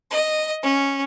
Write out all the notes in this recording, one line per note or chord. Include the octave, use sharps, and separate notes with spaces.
D#5
C#4